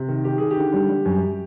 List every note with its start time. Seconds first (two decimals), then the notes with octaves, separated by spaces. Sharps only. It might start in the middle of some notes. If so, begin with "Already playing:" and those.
Already playing: C3
0.08 D#3
0.24 D#3 G4
0.38 D#3 G#4
0.51 G4
0.57 D3
0.74 G3
0.90 G3
1.06 F#2